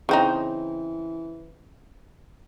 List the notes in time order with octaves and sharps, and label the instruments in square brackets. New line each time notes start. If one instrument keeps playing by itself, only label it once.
[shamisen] C#3 C4 D#4 [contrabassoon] E3